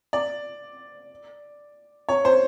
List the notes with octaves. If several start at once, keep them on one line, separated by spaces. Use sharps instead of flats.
D5
C#5
C5